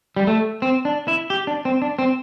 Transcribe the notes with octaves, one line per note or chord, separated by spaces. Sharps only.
G3
A3
C4
D4
E4
G4
D4
C4
D4
C4